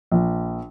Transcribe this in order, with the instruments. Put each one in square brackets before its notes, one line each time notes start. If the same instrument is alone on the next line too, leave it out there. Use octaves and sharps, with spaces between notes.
[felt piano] A#1